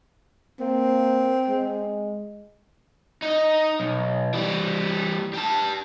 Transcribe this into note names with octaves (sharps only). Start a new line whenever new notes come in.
A#3 C4
G#3
D#4 D#5
B1
E3 G3
G4 A5